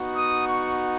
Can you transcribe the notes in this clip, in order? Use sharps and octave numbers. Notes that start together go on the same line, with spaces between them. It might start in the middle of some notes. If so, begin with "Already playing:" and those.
Already playing: B3 D#4 F#4
D#6
C#6